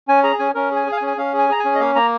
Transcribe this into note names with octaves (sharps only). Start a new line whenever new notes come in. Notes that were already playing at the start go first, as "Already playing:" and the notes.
C#4 G#5
G#4 A#5
C#4 G#5
C#4 A#4
G#4 G#5
G#4
F5
G#5
C#4
G#5
C#4 F5
G#4 G#5
G#4 A#5
G#5
C#4
D#5
A#3 F5
A#3 A#5